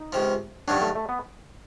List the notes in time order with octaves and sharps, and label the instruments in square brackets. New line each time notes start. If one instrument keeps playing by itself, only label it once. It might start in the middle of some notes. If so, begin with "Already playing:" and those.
Already playing: [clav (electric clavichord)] D#4
[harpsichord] C#2 C3 F3
[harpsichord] G2 D#3 F#3 [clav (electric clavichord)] D4
[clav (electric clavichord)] A3
A3
B3